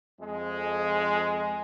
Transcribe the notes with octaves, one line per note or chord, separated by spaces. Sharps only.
F2 G#3